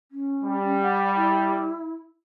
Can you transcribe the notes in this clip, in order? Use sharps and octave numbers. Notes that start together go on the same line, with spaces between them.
C#4
G3
F#5
E4